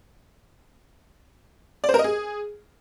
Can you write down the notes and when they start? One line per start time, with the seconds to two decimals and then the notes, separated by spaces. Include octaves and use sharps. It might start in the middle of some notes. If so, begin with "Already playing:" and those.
1.84 D5
1.89 C5
1.94 A#4
1.99 D#5
2.04 G#4